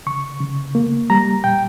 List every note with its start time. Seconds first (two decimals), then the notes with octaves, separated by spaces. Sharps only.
0.06 C#3 C#6
0.41 C#3
0.75 A#3
1.10 G3 A#5
1.44 A#2 G5